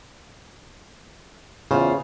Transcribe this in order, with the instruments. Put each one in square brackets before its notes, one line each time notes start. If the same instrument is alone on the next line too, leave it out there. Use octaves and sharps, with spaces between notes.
[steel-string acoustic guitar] E2 F4 C5 [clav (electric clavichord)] C#3